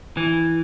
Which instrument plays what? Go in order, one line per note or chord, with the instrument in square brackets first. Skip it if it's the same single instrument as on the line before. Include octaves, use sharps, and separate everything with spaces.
[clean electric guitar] E3